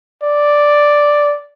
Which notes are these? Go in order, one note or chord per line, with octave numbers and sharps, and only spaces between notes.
D5